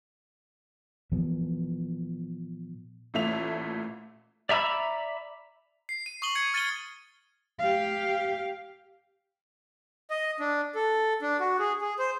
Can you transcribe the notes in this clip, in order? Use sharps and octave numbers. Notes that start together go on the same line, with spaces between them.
A#2 E3 F3 B3
A1 A#2 A3 E5 F7
D5 E5 A#5 B5 E6
C7
D#7
C#6 D#6 D#7 F#7 G7
G#6 C#7 D#7
F6 A6 C#7 D#7 F#7 G7
G4 F5
D#5
D4
A4
D4
F#4
G#4
G#4
C5